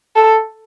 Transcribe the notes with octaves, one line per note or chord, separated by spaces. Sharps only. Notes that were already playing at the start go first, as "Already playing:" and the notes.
A4